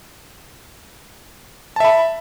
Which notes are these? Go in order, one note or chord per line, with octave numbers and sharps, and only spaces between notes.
E5 A5 B5